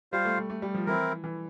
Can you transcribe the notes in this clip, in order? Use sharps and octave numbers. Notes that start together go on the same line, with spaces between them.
G3 F4 C5 F5
A3
A3
A3
G3
F3
E3 C4 E4 A#4
E3